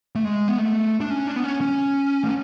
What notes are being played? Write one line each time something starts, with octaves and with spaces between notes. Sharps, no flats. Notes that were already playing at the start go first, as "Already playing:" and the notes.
A3
G#3
B3
A3
D4
C#4
D4
B3
C#4
C#4
A3